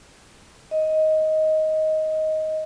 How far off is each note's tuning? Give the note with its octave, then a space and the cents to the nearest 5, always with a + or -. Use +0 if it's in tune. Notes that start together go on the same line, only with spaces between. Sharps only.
D#5 +10